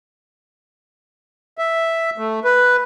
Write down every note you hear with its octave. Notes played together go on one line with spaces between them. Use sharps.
E5
A3
B4